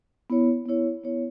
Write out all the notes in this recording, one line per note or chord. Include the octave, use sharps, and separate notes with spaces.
B3 E4 C#5
B3 E4 C#5
B3 E4 C#5